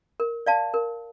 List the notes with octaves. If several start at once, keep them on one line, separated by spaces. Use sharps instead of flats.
A#4
D5 F5 A5
A#4